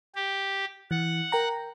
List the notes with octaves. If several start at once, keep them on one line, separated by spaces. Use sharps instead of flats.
G4
E3 F#5
A#4 G5 A#5